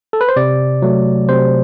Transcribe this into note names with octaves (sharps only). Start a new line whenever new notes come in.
A4
B4
C5
C3 D5
F#3 A3
C3 C5